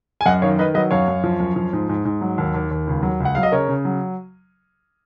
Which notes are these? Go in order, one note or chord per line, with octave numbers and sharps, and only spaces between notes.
G#5
F#2 D#5 F#5
D#3 C#5 F5
D#3 B4 D#5
F#3 B4 D#5
F#2 C#5 F5
F#2
F3
F#2
F3
G#2
G#2
G#2
F#3
D#2
D#2
D#2
C#2
F#3
C#2
F#5
F#3 F5
D#5
C#3 A#4 C#5
C#3
F#3